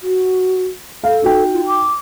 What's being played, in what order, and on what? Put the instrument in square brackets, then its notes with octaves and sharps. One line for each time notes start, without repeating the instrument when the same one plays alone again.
[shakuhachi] F#4
[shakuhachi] A4 [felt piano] F5
[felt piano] D#4 F#4 G5
[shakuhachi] F4
D6